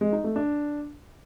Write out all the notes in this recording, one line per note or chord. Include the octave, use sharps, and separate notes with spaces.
G#3
D#4
A3
D4